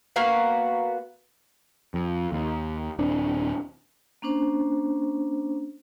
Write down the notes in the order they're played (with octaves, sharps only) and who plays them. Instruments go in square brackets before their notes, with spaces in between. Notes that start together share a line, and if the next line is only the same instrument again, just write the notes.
[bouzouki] A#3 B3 F#4 F5
[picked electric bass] F2
D#2
D#1 C4 D4
[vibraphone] A#3 C#4 D4 C5